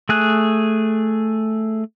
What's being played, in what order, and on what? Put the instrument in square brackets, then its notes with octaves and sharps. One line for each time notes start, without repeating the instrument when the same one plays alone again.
[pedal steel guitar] A3 G#4 F#6